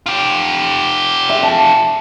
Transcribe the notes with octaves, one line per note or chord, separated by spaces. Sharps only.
F4 G4
E5
A5